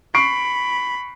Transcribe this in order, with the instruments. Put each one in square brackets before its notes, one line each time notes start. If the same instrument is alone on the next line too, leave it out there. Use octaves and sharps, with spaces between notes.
[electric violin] B5 [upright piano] C#6 C7 D7